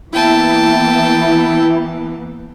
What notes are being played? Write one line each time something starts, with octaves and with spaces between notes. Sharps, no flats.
E3 A#3 B3 E4 G5 A5